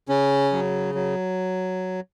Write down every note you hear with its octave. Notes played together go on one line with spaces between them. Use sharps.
C#3 C#4
F#3
F#3